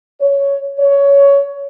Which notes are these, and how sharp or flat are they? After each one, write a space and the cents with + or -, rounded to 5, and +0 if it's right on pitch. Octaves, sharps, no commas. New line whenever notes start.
C#5 +10
C#5 +15